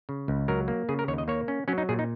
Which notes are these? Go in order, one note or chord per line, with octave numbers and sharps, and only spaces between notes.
C#3
C#2
F#3 A#4
A#3
C#3 G#4
A#4
D#2 C#5
D#5
A#3 C#5
C#4
F#3 C#4
D#4
A#2 G#4
D#4